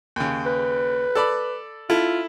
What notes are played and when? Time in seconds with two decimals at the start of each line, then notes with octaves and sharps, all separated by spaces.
0.16 D#2 C#3
0.46 B4
1.15 A4 D5 B5
1.90 E4 F4 A4